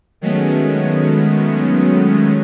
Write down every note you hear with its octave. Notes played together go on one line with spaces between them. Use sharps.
D#3 F#3 G#3 A3 B3 C#4